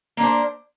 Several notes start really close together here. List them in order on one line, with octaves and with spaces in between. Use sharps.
A#3 D4 C5